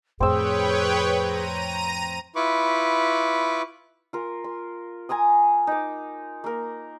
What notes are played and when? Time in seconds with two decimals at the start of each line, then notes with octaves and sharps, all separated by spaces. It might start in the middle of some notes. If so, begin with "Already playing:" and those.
0.20 F2 A2 C4 G#4 B4 C#5 G5 E6
1.19 A#5 D#7
2.36 E4 F4 B4 B5 C#6 D6
4.13 F4 A#4
4.44 C6
5.09 G#5 A#5 C6 D#6
5.67 D#4 D6
6.44 A#3 A#4